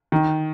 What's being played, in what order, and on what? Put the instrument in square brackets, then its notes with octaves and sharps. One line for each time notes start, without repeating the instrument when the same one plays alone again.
[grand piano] D#3